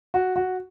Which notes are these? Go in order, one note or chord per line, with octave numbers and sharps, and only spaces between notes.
F#4
F#4